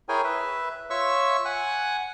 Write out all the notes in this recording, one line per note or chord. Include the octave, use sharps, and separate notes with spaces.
E4 G#4 A#4 C#5 G5 G#5
B4 E5
F4 C#5 E5 C#6 E6
F#5 G#5 F#6